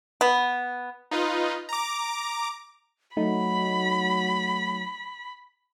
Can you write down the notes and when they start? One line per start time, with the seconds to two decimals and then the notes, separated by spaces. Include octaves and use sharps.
0.21 B3
1.11 D#4 F4 B4 D#5
1.69 A#5 D6
3.17 F#3 A3 D#4 B5